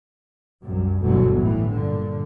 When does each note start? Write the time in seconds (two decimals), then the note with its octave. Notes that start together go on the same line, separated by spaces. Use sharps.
0.64 C2 F#2
1.00 G1 D2 B2 D3 E3 F#3
1.36 A2 E3
1.68 G2 A#2 D3